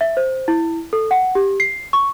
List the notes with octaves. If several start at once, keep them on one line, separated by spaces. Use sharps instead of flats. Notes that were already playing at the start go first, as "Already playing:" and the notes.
E5
C5
E4
A4
F#5
G4
C7
C#6